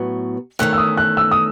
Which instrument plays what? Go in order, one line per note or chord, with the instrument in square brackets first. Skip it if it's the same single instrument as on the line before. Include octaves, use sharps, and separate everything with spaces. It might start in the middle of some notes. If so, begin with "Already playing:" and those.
Already playing: [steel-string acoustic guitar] A2 F#3 B3
[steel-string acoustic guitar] E2 D#3 A3 C#4 [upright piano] F#6
[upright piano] E6
D#6
F#6
E6
D#6